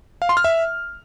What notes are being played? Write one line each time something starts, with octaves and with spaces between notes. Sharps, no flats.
F5
C6
F6
E5